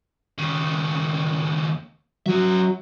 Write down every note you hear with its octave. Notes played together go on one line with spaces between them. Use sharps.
D#2 C#3
F#3 C#4 E5